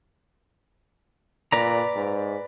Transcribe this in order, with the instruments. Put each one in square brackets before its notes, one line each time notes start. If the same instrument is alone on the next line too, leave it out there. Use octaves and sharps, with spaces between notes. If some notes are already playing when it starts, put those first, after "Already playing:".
[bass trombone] A#2 [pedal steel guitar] B4 D5 A#5
[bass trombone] G#2